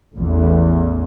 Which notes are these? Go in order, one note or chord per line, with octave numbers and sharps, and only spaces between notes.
A1 E2